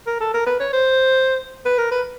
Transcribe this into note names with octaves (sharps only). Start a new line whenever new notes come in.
A#4
A4
A#4
B4
C#5
C5
B4
A#4
B4